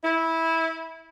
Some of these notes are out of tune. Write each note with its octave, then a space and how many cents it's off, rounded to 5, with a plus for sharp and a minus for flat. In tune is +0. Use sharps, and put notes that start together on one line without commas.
E4 -15